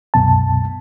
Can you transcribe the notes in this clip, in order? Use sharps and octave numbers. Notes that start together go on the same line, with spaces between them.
C2 F#2 B2 A5